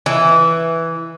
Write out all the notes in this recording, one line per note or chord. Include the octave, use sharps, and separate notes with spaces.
E3